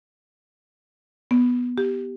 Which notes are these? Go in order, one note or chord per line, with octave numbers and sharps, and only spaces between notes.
B3
G4